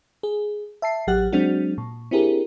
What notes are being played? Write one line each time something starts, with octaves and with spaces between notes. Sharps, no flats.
G#4
E5 A5 C7
A1 F#3 G4 F#5 F#6
F#3 G#3 C4 D4 F#4
A#2
C4 D4 E4 G4 G#4 A#4